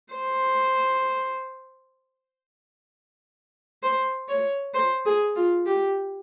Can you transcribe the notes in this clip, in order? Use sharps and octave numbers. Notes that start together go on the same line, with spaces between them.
C5
C5
C#5
C5
G#4
F4
G4